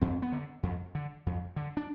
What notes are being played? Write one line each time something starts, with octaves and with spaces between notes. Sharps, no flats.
F2 C4
B3
D3
F2
D3
F2
D3
D4